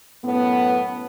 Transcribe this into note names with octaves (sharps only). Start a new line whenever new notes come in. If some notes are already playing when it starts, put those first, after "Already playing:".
F#2 A2 B3